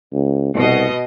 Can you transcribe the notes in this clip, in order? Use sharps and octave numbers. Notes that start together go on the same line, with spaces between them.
C#2
C2 B2 D#5